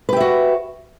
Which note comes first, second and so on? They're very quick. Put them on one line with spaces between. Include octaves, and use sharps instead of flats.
B4 G4 E5 F#4